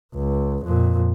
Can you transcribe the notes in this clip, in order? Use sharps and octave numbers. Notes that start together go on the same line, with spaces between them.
C#2
F2 A#2